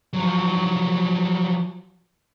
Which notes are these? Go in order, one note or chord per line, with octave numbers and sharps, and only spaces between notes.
F3 F#3